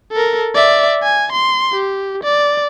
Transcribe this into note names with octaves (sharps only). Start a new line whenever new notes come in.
A4 A#4
D5 E5
G#5
C6
G4
D5